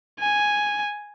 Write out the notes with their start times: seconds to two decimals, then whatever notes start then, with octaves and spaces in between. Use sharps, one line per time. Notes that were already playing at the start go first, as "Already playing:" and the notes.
0.20 G#5